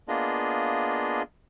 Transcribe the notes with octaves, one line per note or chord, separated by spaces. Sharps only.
A#3 B3 D4 F4 G#4 D#5